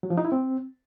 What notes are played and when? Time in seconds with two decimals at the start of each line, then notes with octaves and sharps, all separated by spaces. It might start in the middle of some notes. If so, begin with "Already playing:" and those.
0.03 F#3
0.10 F3
0.18 D#4
0.25 E4
0.32 C4